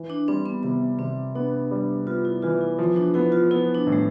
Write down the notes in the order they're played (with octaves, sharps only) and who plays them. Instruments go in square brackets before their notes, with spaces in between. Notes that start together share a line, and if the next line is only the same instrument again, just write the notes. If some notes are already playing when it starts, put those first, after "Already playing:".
Already playing: [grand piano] E3
[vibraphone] D4
[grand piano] G3 [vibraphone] C4
[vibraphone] B3
[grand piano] C3 [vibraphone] B3
[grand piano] C3 [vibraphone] C4
[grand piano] B3 [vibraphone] D4
[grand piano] G3
[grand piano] B3 [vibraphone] F4
[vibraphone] E4
[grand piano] E3 [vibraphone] F4
[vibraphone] E4
[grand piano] F3
[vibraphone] D4
[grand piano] B3 [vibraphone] E4
[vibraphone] F4
[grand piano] B3 [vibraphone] E4
[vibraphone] D4
[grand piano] A2
[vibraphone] G3